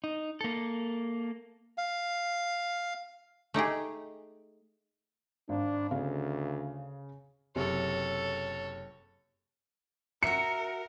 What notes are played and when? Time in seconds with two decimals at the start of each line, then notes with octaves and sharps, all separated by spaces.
0.04 D#4
0.41 A#3 A4
1.78 F5
3.54 A3 D#4 G4 G#4
5.49 G#1 D4
5.91 D2 C#3 F5
7.56 F#1 C3 A4 C#5
10.23 F#4 A#4 E5 C#7